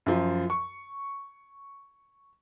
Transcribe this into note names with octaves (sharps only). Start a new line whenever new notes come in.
F#2 F3
C#6